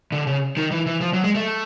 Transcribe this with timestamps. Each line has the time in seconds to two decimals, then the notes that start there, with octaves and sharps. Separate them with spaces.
0.12 D3
0.27 C#3
0.57 D#3
0.71 E3
0.86 E3
1.01 F3
1.13 F#3
1.24 G#3
1.35 A3